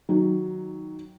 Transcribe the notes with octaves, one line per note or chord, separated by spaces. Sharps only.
D#3 F#3